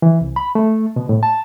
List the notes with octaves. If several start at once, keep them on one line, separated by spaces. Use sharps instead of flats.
E3
C2
B5
A3
B2
A2
A5